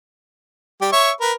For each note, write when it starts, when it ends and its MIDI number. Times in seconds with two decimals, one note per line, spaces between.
0.81 0.88 55
0.81 0.88 67
0.93 1.11 73
0.93 1.11 76
0.93 1.11 85
1.21 1.33 70
1.21 1.33 71